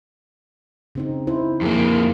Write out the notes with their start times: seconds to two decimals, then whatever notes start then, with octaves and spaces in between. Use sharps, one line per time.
0.95 C#3 C4 D#4
1.27 E4 C5
1.61 F2 A#3 E4 G#4